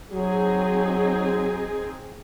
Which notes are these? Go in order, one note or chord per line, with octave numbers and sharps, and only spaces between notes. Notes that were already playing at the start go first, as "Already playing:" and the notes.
F#3 C4 D#4 G#4